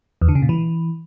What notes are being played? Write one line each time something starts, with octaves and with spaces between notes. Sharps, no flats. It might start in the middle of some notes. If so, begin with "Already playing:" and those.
E2
D3
C#3
A#2
E3